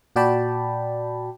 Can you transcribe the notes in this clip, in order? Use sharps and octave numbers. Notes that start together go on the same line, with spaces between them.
A#2 F#4 D5 G5 A5 B5